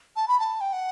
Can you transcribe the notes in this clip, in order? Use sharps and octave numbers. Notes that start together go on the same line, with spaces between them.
A5
B5
A5
G5
F#5